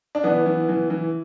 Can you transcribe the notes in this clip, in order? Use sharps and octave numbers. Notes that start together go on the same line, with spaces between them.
D4
E3 B3
E3
E3
E3